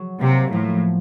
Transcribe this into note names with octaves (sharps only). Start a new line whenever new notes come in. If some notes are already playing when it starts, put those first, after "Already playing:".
Already playing: F#3
C3 A#3
A2 F3